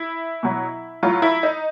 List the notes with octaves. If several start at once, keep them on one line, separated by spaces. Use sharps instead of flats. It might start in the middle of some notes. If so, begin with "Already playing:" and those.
Already playing: E4
B2 F#3
A2 F#3 F4
E4
D#4